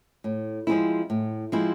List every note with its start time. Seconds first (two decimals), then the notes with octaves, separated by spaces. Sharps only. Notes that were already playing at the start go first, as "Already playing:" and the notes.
0.24 A2
0.67 F3 G#3 C4 E4
1.10 A2
1.52 F3 G#3 C4 E4